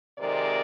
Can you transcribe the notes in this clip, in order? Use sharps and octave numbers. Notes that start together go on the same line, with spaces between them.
F2 C3 D#3 G#3 A#4 D5